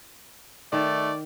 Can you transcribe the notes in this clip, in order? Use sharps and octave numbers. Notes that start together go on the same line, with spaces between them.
D#3 A3 D5